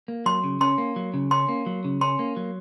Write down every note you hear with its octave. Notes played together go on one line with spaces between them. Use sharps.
A#3
F#3 C6
C#3
C#4 C6
A#3
F#3
C#3
C#4 C6
A#3
F#3
C#3
C#4 C6
A#3
F#3